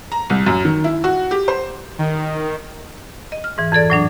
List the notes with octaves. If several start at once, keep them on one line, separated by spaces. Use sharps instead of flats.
A#5
C2
F#2
D#3
E4
F#4
G4
C5
D#3
D#5
F6
G#2 E3
F2 E3 A4 D5
A2 F#3 D4